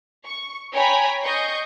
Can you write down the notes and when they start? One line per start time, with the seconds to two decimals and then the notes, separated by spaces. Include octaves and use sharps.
0.25 C#6
0.74 C#5 G5 G#5 A#5 B5
1.23 D#5 C#6 G6 C7